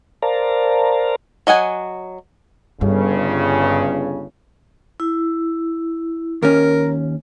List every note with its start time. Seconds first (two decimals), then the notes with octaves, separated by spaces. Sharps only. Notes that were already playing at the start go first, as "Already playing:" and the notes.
0.22 A#4 C5 D5 F5 A5 A#5
1.47 F#3 D#5 F#5 G#5
2.81 G1 G2 C#3
5.00 E4
6.42 D#2 C#4 A#4